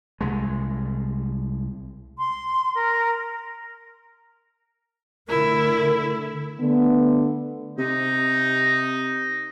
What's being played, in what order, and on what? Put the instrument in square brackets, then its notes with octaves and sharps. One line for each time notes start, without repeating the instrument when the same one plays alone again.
[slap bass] C2 G#3
[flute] C6
A#4
[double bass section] D3 A3 [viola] E4 [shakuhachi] A#4
[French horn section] D3 A3 B3
[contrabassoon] C3 [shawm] D#4